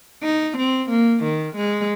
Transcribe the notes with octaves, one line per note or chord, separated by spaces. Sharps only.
D#4
C4
A#3
D#3
G#3